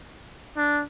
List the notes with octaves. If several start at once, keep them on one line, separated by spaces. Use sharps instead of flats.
D4